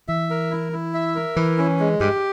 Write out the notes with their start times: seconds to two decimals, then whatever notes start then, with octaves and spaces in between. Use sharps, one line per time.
0.08 E3 E5
0.30 A#4
0.51 E4
0.73 E4
0.94 E5
1.15 A#4
1.36 E3 E4
1.58 C#4
1.80 G#3
2.00 G2 G4